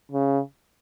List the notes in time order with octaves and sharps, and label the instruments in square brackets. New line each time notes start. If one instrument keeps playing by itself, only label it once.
[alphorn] C#3